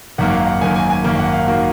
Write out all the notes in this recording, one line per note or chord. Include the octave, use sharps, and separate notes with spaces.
G#1 F#2 D#3 A#3 F#5
F5
F#5
G#1 F#2 D#3 A#3 G#5
G#5
G#5
G#1 F#2 D#3 A#3 A#5
F#5
F5
D#3 A#3 F#4